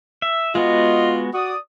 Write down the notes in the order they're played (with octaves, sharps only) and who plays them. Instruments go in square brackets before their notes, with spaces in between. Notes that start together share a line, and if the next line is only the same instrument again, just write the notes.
[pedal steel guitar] E5
[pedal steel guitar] G#3 B3 F#4 [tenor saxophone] F4 [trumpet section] D#5
[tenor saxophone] F#4 [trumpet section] D5 D#6